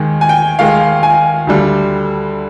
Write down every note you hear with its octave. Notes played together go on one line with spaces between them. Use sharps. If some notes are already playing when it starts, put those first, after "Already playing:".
Already playing: D#2 D#3 G#3
G#5
G5
D#2 D#3 G#3 F5
G#5
D2 D3 G3